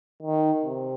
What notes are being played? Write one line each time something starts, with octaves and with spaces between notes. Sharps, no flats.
D#3
C3